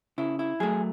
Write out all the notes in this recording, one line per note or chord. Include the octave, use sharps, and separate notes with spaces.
C#3 E4
E4
F#3 A3 G#4